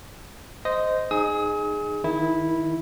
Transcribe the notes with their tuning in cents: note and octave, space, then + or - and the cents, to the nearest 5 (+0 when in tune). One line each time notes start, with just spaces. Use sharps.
C5 -15 D#5 +0
D#4 -20 G#4 +0 D#6 +40
D#3 +20 E4 -10